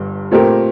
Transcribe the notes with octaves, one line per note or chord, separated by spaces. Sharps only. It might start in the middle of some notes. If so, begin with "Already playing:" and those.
Already playing: G1 G2
A#2 A3 C4 G4 A#4